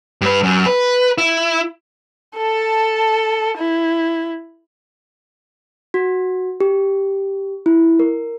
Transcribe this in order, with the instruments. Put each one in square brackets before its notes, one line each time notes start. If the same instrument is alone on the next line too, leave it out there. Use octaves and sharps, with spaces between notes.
[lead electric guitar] G2 B4
F#2
B4
E4
[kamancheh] A4 A5
E4
[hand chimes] F#4
G4
E4
A#4